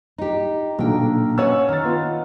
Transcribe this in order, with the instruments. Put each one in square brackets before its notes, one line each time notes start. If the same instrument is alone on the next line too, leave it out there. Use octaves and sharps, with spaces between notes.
[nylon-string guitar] D#4 G4
[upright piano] B1 A#2 D3 [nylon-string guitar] A#3 G5
[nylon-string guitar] C#4 F#5 G#5 [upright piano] C#5 E6
[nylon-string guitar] D#3 [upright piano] F6 A6
[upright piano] B3 F4